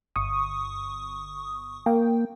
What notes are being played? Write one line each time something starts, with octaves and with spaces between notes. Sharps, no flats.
G1 C#6 D#6
A#3 G5